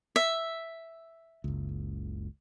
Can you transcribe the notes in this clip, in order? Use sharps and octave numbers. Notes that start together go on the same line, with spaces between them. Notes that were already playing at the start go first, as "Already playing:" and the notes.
E5
F#1 C#2